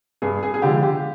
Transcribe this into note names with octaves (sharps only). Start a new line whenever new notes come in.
G2 G#4
G#4
G#4
D3 F3 G#3 G4
G4